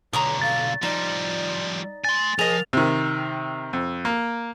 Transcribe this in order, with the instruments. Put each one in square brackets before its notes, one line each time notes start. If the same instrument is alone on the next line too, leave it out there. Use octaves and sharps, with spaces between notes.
[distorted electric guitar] B1 D3 [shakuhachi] C#5 [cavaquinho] A#5 C#6 D#6
[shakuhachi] F5 [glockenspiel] A6
[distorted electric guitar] F3 G3 [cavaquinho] D#4 [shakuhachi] D5
[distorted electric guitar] G#5 C6 [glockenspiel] A6
[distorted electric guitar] F3 [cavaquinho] G#4 D#5 [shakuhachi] A#4 [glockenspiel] F7
[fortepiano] C3 D#3
F2
A#3